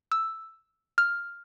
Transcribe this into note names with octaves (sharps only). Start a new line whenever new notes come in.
E6
F6